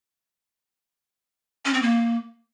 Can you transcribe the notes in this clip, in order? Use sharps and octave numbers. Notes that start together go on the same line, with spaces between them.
C#4
C4
A#3